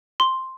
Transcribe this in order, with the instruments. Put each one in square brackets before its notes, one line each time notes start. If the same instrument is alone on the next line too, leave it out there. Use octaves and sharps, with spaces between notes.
[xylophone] C6